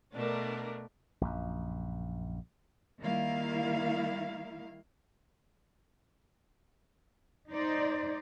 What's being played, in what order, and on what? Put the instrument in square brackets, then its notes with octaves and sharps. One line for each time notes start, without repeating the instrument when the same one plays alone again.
[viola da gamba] B2 A3 [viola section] D4 A#4
[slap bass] A#1 F#2
[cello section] D#3 G3 A#3 E4 F5
D#4 C5 D5